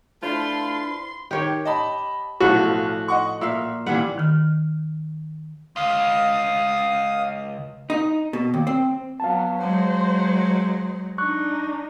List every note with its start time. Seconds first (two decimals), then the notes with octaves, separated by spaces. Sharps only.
0.23 A3 D4 E4 F4 B4 C5 C6
1.31 D#3 G4 C#5 G5
1.65 D#5 A5 B5
2.40 B1 A2 F3 F#4
3.08 D#5 F#5 C#6
3.41 A#2 E5 F5 E6
3.86 A#2 E3 G3 F#5
4.18 D#3 F6
5.76 C#2 F5 D#6
7.90 D#4
8.33 B2
8.54 D#2
8.67 C4
9.20 F#3 B3 F5 A5
9.61 F#3 G#3 C5
11.18 D4 D#4 C#6 F#6